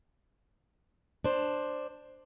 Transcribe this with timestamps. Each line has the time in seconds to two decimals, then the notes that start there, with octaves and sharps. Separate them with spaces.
1.24 D4 C5